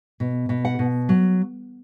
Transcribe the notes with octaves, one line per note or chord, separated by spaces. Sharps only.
B2
B2
F#5
B2
F#3